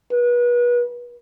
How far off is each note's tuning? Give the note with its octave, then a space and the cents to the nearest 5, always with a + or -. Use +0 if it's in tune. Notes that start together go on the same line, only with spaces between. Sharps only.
B4 -35